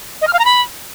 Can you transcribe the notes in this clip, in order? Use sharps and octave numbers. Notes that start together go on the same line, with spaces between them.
D#5
F6
F5
A#5
B5